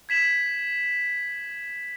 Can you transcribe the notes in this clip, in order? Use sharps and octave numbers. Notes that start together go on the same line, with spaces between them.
G#6 B6 E7 F#7